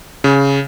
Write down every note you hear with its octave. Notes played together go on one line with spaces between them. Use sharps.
C#3